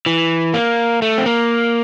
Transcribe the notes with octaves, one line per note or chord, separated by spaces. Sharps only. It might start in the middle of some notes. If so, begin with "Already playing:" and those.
E3
A#3
A3
C4
A#3